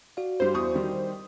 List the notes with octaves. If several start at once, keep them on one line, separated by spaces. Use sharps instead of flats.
F#4 D5 F5
G2 G3 C5
E2 C#6 D#6
D#3 G3